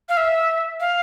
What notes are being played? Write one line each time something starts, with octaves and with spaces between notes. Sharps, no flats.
F5
E5
F5